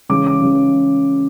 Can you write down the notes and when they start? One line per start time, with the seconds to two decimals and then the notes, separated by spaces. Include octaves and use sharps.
0.09 C#3 E3 G#3 D6
0.27 D6
0.42 C#3 E3 G#3